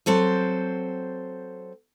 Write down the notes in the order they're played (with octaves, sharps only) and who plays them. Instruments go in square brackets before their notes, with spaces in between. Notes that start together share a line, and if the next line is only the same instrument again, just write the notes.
[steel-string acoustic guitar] F#3 C4 A4 C5